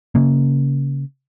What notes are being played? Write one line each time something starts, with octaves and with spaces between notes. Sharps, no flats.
C#3 A#3